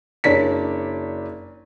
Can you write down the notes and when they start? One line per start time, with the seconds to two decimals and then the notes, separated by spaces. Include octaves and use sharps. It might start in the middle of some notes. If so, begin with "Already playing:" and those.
0.24 F#1 D4 C#5 D5 B6